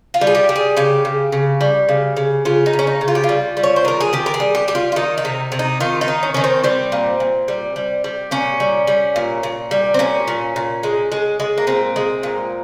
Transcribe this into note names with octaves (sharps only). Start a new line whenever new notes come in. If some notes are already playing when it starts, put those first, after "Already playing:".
F4
G3
G#4
G4
G3
G#4
C#3 G4
C#3
C#3
G3
C#3
C#3
C#3 F4
D#4
C#3
C#4
D#4
C#3
F4
G4
F4
G3
G3
C#5
C5
D#3 A#4
G#4
D#3 G4
A#4
G#4
G3
G4
G3 G4
F4
F4
D#3 D#4
D#4
C3
C3
D#4
D#3 F4
D#4
D#3
C#4
D#3 C#4
C4
G3 C4
A#2
A#2
G3
G3
G3
A#2 C#4
G3
G3
A#2
A#2
G3
C4
A#2 C#4
A#2
A#2
G#3
G#3
G#3
A#3
A#2 C4
G#3
A#2